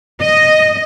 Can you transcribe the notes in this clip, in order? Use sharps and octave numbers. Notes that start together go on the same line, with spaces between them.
D#5